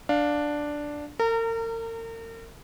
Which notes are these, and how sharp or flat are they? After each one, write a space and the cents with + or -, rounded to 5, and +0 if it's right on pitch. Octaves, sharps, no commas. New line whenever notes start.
D4 +0 F5 +15
A#4 -40 A#5 -25